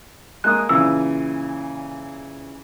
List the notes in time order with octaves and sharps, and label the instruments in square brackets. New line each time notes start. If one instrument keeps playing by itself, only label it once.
[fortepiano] G#3 A#3 D#6 [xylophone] F#6
[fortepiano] A#2 C#3 E3 [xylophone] E6